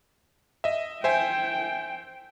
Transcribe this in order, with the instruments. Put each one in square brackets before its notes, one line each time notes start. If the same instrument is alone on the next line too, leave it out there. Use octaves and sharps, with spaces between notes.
[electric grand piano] D#5 E5
[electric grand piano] C5 E5 G#5 [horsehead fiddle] G5